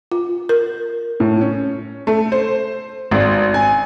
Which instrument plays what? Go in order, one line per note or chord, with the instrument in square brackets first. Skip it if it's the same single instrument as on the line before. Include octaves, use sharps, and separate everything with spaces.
[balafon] F4
A#4
[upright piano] A2
C#4
A3
C5
G#1
G#5